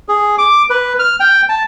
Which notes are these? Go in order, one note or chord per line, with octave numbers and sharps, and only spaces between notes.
G#4
D6
B4
F6
G5
A5